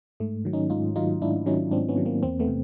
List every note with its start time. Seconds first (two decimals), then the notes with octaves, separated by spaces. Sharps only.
0.20 G#2 A3
0.45 D#3 F#3
0.53 C#4 D#4
0.70 G#2 D#4 F4
0.96 D#3 F#3 D#4 F4
1.22 G#2 D4 E4
1.46 D#3 F#3 C#4 D#4
1.71 G#2 C4 D4
1.88 B3 C#4
1.97 D#3 F#3
2.05 A#3 C4
2.23 E2 A#3 C4
2.40 A3 B3
2.48 C3